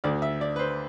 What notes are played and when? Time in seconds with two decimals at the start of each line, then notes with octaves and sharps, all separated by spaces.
0.04 D2 D3 A3 D5
0.22 E5
0.41 D5
0.56 B4
0.59 C5